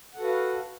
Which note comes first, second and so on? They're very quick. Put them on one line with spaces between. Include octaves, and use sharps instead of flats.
F#5 A4 F#4 B4 F5